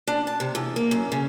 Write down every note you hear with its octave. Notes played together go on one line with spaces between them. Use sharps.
D4
A5
C3
E2
A#3
F#2
C#3